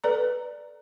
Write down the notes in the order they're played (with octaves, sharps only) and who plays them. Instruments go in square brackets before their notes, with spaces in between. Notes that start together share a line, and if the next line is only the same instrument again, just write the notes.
[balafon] A4 B4 D5 A#5